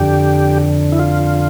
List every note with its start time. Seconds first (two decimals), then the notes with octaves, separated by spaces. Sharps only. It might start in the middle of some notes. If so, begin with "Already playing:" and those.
Already playing: F2 D3 G4
0.92 E4
0.99 F4